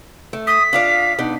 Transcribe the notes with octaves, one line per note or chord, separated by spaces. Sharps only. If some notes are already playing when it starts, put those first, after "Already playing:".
A3
D#6 B6
D4 F4 D5 F5
B2 D4 D#4